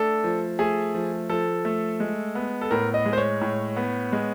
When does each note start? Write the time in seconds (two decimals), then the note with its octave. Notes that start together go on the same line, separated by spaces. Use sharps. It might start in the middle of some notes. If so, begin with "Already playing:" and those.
Already playing: A3 D4 A4
0.24 F3
0.59 A3 G#4
0.94 F3
1.29 F3 A4
1.65 A3
2.00 G#3
2.35 B3
2.61 A4
2.71 A2 A#4
2.94 D#5
3.06 G#3
3.13 C5
3.18 C#5
3.41 A2
3.76 B3
4.12 G#3